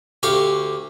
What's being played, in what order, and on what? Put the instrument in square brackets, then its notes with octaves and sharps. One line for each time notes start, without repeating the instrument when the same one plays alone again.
[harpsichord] D2 G4 F5 C#6